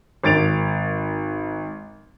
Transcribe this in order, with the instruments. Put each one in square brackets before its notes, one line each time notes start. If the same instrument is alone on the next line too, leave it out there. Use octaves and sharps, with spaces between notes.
[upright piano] G#1 A6 D7 F7